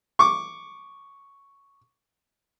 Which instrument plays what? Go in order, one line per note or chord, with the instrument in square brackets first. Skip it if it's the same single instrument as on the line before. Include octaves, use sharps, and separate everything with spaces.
[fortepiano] C#6 D6